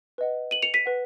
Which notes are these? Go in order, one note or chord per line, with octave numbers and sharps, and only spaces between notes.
B4 D#5 F#5
D#7 F#7
C#7 F7
B6 D#7
B4 F#5